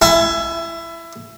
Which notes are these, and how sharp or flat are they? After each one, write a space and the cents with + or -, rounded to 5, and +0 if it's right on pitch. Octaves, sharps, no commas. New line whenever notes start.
E4 +20 G#5 +45